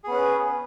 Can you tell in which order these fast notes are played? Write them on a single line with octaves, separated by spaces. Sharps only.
G#4 B3 C#4 B4